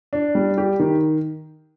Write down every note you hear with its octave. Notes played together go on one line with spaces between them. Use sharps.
D4
G3
G4
D#3